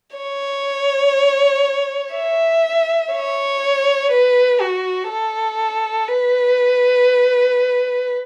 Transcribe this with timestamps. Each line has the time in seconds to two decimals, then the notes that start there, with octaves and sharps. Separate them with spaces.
0.17 C#5
2.14 E5
3.12 C#5
4.11 B4
4.60 F#4
5.09 A4
6.08 B4